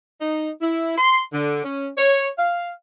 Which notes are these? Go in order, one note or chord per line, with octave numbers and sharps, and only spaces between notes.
D#4
E4
C6
D3
C#4
C#5
F5